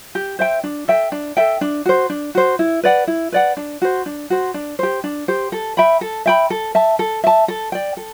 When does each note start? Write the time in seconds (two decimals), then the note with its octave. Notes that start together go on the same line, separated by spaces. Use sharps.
0.15 G4
0.39 C5 E5 G5
0.64 D4
0.88 A4 E5 G5
1.12 D4
1.37 A4 E5 G5
1.61 D4
1.85 F#4 C5
2.10 D4
2.35 F#4 C5
2.59 E4
2.83 B4 D5 F#5
3.07 E4
3.32 B4 D5 F#5
3.57 D4
3.82 F#4 C5
4.06 D4
4.30 F#4 C5
4.54 D4
4.79 G4 C5
5.04 D4
5.28 G4 C5
5.52 A4
5.77 E5 G5 B5
6.01 A4
6.26 E5 G5 B5
6.50 A4
6.75 E5 A5
6.99 A4
7.24 E5 A5
7.48 A4
7.72 D5 G5
7.97 A4